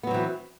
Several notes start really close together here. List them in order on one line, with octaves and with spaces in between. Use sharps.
B3 F#3 C4 E3